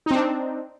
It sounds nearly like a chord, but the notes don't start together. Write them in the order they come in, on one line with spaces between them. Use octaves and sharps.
D#4 C4 D4